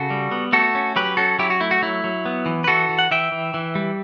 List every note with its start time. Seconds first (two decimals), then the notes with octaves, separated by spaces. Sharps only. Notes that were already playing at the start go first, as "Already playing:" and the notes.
Already playing: C#3 F#4 A4
0.10 G3
0.32 B3
0.53 A3 F#4 A4
0.75 C#4
0.96 F#3 G4 B4
1.17 C#4 F#4 A4
1.39 F#3 E4 G4
1.50 F#4
1.60 A3 E4
1.71 F#4
1.82 F#3 E4
2.04 F#3
2.25 B3
2.46 E3
2.64 B4
2.68 E3 F#4 A4
2.89 E3
2.99 F#5
3.11 E3 E5 G5
3.32 E3
3.54 E3
3.75 G3